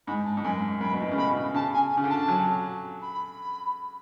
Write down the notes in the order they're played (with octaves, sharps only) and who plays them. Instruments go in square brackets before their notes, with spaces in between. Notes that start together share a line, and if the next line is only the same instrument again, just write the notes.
[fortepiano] G#2 [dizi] B5
[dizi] A5
[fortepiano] G#2
[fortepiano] F#2 [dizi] G#5
[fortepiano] F#2 [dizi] B5
[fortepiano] B2
A2
C#3
[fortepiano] B2 [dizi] B5
[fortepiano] C#3
[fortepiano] C#3 [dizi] A5
[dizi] G#5
G#5
[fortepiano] C#3
D3
[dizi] A5
[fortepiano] F#3
[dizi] B5